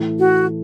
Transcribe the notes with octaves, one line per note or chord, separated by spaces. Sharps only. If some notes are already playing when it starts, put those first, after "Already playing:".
Already playing: A2 E3 A3
F#4